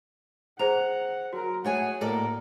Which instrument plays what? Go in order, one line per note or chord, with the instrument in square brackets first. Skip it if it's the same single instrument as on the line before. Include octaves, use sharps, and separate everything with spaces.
[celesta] G#4 C5 F7 [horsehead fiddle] F#5 [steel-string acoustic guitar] A#5
[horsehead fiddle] F#3 A#4 [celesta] F#4
[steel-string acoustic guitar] A3 C#5 G#5 [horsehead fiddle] G#4 F#5
[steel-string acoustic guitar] A2 A4 D5 [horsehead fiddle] A#3 A#4